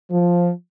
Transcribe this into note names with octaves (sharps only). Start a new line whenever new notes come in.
F3